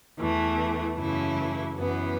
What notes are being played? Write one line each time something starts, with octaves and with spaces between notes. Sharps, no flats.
E2 E3 A3
F#2 C#3 E3 A3 E4
F#2 E3 B3